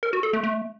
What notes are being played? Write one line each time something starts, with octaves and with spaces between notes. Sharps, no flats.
A#4
F#4
A4
A3
A3